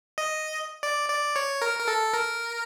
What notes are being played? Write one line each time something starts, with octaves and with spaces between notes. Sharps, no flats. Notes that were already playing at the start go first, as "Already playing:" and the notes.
D#5
D5
D5
C#5
A#4
A#4
A4
A#4